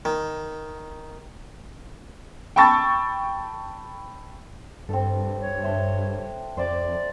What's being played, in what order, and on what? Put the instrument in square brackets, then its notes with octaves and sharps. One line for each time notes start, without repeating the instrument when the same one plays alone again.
[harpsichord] D#3
[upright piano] G5 A5 B5 C#6 E6 A6
[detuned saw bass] G2 [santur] C4 A4
[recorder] C#5
[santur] D4 C5 E5
[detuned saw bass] F2 [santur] C5 D6 [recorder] D5